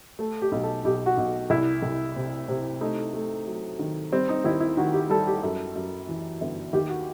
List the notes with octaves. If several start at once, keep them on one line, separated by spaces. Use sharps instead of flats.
A3 A4
G4
B1
A4
B1 G4
F#4
B1
C2 E4
C2
C3
C3
A3 D#4
A3
F#3
D#3
G3 C4
D#4
D#2 E4
E4
D#3 F#4
G4
G3 A4
G4
F#2 A4
F#2
E3
G1
D#2 G4
F#4